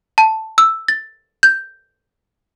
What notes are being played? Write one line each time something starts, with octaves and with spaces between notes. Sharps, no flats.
A5
E6
A6
G6